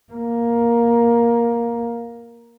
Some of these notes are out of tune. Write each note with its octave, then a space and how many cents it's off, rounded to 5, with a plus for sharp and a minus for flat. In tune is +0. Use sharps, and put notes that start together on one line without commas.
A#3 +10